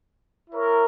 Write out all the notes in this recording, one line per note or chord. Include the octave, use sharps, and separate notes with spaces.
E4 A#4 C#5